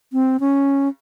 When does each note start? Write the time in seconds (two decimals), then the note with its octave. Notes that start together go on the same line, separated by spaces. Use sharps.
0.13 C4
0.40 C#4